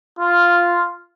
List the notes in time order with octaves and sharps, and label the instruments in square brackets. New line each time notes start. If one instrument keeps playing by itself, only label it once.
[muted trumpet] F4